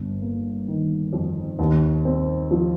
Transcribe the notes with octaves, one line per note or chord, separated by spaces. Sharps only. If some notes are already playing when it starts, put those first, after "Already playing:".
Already playing: G1
A#3
D#3
F2
D#2
C4
F3